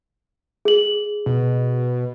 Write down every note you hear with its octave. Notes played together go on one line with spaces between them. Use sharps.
G#4 F#7
B2